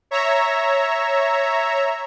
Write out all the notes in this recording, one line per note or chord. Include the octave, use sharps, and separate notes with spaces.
C#5 E5 A#5